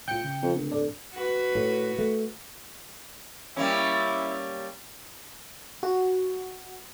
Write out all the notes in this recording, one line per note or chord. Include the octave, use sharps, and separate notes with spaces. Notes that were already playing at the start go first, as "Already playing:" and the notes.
C2 A2 F4 G5 G6 C#7
C#3
F2
D1
E2 A2 D4 A4
F#4 B4
A2
A3
G3 A#3 C#4 E4
F#4